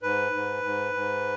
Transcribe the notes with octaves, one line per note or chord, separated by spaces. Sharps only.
G#2 B4
G#2
G#2
G#2